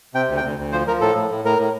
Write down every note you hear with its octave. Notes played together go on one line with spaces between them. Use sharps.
C3 G5
D2
G5
D2
D2
F3 C5
F3 A#4
A2 A4
A2
A2
A2 A#4
A2